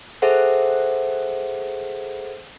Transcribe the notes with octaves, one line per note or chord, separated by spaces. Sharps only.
G#4 A4 C5 E5 F#5